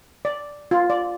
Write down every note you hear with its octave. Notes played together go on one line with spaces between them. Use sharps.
D5
F4
D5